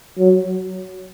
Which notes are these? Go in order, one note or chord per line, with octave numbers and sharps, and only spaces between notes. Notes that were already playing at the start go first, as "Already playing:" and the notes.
F#3